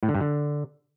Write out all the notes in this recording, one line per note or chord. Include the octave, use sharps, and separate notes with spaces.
A2
D3
G2
D3